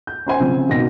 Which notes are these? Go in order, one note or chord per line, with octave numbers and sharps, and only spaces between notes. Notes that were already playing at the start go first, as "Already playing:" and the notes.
G6
C#4 C5 G#5
C#3 F3 C4
G#1 B2 A#6